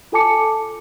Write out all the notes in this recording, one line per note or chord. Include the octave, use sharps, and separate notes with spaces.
F4 A4 G#5 A5 D6 C#7